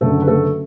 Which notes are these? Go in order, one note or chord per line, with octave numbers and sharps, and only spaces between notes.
F#1 F#2 D3 F#3 A3 A4
B4
A3 A4